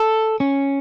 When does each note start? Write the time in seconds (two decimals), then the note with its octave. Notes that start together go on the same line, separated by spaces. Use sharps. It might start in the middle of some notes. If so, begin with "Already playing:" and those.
Already playing: A4
0.40 C#4